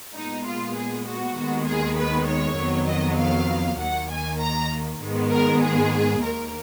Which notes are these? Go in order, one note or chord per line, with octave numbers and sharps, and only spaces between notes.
A#2 G#3 B3 D#4
F4
G#4
F#4
D#2 D#3 G#3 B3
G#4
B4
C#5
F2 D#3 F#3 B3
D#5
F5
D#2 D#3 A#3 F#5
G#5
A#5
G#2 D#3 G#3 B3
A#4
G#4
D#2 D#3 A#3 A#4